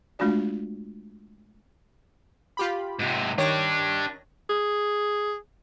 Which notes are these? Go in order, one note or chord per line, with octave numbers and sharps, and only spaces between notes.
G#3 A3 D4 F4 F#4 D5
F4 G4 B5
G#2 C3
D#3 D4 G4 C#5 A#6
G#4